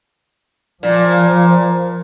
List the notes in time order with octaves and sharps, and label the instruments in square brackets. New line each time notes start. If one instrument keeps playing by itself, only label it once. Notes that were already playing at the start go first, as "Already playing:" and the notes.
[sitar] A#2 [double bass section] F3